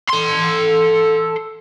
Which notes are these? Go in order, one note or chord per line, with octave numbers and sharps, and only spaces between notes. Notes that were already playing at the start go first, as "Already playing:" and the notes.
A4 C6